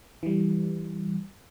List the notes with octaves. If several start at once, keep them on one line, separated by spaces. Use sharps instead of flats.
E3 G3